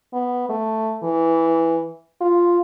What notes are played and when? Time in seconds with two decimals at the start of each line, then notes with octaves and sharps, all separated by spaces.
0.13 B3
0.49 A3
1.03 E3
2.21 F4